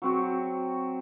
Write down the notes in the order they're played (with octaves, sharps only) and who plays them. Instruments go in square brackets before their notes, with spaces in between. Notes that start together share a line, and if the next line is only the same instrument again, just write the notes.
[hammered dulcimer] F#3 C4 F#4